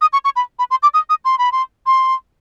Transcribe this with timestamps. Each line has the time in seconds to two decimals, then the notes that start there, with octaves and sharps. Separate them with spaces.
0.01 D#6
0.13 C#6
0.25 C#6
0.36 B5
0.59 B5
0.71 C6
0.83 D6
0.94 D#6
1.10 D#6
1.25 C6
1.38 B5
1.52 C6
1.86 C6